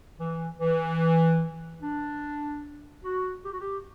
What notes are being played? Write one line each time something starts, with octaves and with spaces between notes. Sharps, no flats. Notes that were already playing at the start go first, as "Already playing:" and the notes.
E3
E3
D4
F#4
G4
F#4
G4